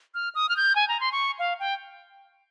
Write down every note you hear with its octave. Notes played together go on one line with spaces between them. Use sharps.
F6
D#6
F6
G6
G#5
A#5
C6
C#6
F5
G5